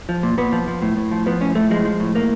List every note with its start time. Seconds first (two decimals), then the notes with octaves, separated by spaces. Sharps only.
0.09 F3
0.23 A#2
0.38 A#2 B3
0.52 F3
0.68 F3
0.82 A2
0.97 A2
1.11 F3
1.26 F3 B3
1.41 A2 C#4
1.55 A2 A3
1.70 F3 G#3
1.85 F3
2.00 A2
2.15 A2 A#3